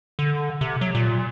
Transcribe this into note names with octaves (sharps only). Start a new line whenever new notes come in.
D3
C3
F#3
A#2